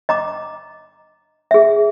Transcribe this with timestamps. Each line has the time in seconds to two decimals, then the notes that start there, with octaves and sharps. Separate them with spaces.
0.09 D#5 A#5 D6
1.51 G#4 E5